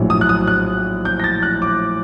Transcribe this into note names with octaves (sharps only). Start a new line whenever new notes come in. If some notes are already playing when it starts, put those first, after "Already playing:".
Already playing: A#1 A2 F#3
D#6
F#6
D#6
F#6
G6
A#6
A6
F#6
D6